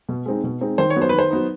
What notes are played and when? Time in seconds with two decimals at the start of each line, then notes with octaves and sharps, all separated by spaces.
0.09 B2
0.26 G#3 C4 D#4
0.44 B2
0.61 G#3 C4 D#4
0.78 D#3 C5
0.90 C#5
0.96 F#3 B3 D#4
1.02 C5
1.09 B4
1.13 D#3
1.19 C5
1.31 F#3 B3 D#4